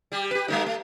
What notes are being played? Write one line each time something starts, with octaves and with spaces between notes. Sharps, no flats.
G3 G4
G4 B4
G3 A3 D#4
A3